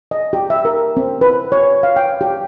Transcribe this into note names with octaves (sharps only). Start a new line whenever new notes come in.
D#5
G4
E5
A#4
C4
B4
C#5
F5
G5
G4